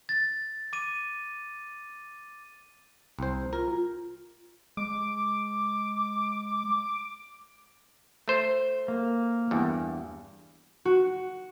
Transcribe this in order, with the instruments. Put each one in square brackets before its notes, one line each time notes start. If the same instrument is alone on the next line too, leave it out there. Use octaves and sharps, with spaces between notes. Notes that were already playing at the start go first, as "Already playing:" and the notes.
[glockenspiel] A6
D6 D#7
[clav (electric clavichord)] C2 C5
[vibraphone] F4 [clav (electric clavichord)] A#4
[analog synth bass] G#3 [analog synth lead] D6
[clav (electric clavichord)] A3 C5
[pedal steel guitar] A#3
[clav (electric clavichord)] E2 G2
[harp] F#4